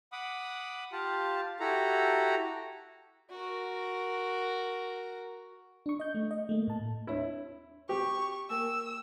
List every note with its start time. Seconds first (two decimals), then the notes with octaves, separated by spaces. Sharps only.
0.12 F#5 B5 D6 D#6
0.92 F4 G4 F5 A5
1.60 E4 F#4 G4 A4 A#5
3.31 F#4 A#4
5.86 D4 C#6
6.00 D#5 G6
6.15 A3
6.31 D#5
6.49 A3 A#3
6.68 A2 A5
7.07 D#2 D4 E4 C#5
7.89 G4 C#6
8.50 A#3 A#4 G5 E6